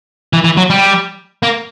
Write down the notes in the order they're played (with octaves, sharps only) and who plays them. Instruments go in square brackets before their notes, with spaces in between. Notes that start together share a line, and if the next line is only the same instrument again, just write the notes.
[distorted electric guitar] E3
E3
F#3
G3
A#3